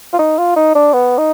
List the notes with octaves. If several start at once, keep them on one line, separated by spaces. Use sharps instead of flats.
F4
D#4
F4
D#4
D4
B3
D#4